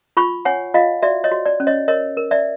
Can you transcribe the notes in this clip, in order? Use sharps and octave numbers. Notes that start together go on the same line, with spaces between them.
F4 B5 C#6
C#5 F#5 G#5
F4 D#5 F5
F#4 D5 E5
C#5 D#5
F#4
D5
C#4
C#5 D#5
A#4 C#5 D#5
A#4
D5 E5